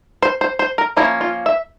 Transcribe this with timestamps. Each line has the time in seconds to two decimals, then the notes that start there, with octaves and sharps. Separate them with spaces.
0.22 C5
0.41 C5
0.59 C5
0.78 A#4
0.97 F3 A#3 C#4 E4
1.21 F4
1.46 E5